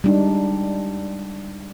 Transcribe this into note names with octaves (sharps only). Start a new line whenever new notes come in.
G3 G#3 D4 D#4